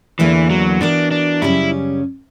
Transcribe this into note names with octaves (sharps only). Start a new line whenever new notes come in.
E2 D3 E3 A#3 E4
F#3
E3 B3 D4 F#4 A#4
D4
F#2 C#3 G3 C#4 E4 G4